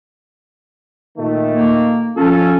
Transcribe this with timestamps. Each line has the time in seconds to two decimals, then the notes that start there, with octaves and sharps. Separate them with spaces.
1.18 A#2 D#3 A3
1.54 A#3
2.17 F3 C#4 F4 A4